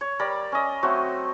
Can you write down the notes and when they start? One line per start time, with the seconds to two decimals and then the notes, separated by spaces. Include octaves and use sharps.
0.01 C#5
0.19 G3 A#4 D5 B5
0.52 C#4 D#5
0.83 F#3 A3 C4 F#4